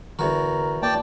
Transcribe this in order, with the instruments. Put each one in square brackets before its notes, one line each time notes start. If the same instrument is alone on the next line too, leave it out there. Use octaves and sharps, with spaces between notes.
[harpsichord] E2 F#4 [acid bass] D3 [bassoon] A#4
[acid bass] A#3 [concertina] D5 G5 A5